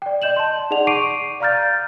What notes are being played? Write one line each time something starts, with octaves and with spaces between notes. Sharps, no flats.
D5 G5
D5 D#5 G6 E7 F#7
A5 C6
D#4 G#4 D5 F#5 F7
C#6 D6 C7 D7 D#7
D5 F5 A#5 F6 G6 A6